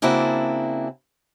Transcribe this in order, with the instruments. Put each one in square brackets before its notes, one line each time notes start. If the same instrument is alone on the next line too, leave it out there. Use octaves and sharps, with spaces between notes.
[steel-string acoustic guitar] C#3 A#3 C4 D4 E4 F#4